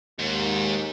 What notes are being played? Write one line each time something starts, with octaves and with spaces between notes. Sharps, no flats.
D#2 G#2